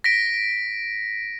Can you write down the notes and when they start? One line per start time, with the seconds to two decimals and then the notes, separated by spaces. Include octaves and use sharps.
0.04 A#6 B6 D7